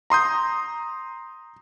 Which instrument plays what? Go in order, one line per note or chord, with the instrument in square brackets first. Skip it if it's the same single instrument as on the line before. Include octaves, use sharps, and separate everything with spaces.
[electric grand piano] A#5 C6 D#6 G6